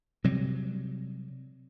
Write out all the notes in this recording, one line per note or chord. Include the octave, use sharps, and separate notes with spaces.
C3 F#3 G3